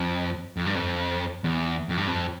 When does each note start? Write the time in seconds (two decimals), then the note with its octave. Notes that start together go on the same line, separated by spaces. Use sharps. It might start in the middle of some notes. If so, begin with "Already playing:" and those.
Already playing: F2
0.57 F2
0.66 G2
0.75 F2
1.44 E2
1.89 F2
1.98 G2
2.07 F2